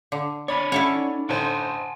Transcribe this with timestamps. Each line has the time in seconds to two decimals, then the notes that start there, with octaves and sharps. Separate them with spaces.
0.12 D3
0.48 D4 C#5 D5 B5
0.72 C#4 E4 A4 C#5 F#5
0.95 D#4
1.29 A1 D3 C5 F#5 G#5 A5 C6